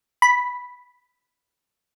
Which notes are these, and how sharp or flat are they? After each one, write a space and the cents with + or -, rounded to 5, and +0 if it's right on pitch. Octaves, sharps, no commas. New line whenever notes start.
B5 -5